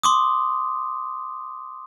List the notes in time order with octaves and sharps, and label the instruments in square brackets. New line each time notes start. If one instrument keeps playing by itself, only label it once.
[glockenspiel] C6 D6 D#6